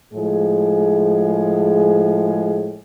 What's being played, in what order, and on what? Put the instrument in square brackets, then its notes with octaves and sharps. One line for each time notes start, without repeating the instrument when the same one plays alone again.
[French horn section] A2 F3 G#3 G#4